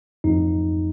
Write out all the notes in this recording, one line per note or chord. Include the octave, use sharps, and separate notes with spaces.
F2 D#4